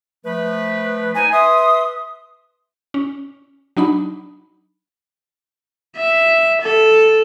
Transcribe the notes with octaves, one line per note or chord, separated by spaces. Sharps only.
F3 A3 B4
D#4 G#5
B4 E5 C6 D#6
C#4
F#3 D4 D#4 B5
E5
A4